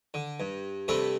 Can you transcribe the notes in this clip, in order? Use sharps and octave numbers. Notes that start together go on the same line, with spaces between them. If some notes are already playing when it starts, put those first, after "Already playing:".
D3
G2
G2 C3 A3 D4 A4 B5